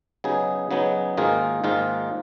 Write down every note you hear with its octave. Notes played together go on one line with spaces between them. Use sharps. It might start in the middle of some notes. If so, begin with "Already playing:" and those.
C#3 F#3 B3 D#4 G#4
C#3 F#3 B3 D#4 G#4
G#2 D#3 A#3 F4 G#4
G#2 D#3 A#3 F4 G#4